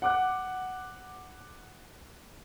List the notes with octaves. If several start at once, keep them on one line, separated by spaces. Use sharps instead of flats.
F#5 D6 F#6